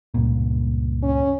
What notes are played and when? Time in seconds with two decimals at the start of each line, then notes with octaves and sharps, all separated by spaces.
0.14 C#2 G2 A#2
1.03 C#4